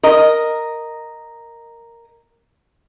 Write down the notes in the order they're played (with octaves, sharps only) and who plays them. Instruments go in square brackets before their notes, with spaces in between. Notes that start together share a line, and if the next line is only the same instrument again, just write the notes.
[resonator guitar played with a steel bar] A#4 D#5